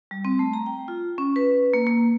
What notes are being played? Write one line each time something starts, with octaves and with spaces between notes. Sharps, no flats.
G3
C4
A3
A#5
G5
F4
C#4
B4
A#3
A#3